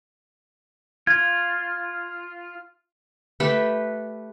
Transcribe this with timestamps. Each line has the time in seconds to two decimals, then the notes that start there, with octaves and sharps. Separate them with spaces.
1.07 F4 G#6
3.40 A3 G4 A4 B4